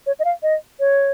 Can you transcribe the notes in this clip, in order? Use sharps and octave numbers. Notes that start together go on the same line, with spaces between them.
C#5
D#5
F5
D#5
C#5